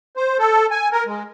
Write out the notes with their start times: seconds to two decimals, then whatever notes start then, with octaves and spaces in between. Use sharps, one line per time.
0.17 C5
0.39 A4
0.71 G#5
0.92 A#4
1.06 G#3